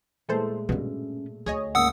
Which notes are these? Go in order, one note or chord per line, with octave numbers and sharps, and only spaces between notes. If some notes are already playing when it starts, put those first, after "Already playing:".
A#2 E3 G#3 A3 A4 C5
G2 B2 B3 C#4
D2 G#4 C#5 D#5
G#2 C#3 A#3 F#5 D#6 E6